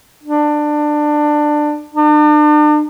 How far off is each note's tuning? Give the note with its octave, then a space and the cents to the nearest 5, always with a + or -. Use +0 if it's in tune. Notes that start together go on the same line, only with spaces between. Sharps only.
D4 +20
D4 +40